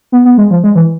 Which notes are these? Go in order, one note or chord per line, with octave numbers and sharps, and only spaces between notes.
B3
B3
G#3
F3
G#3
E3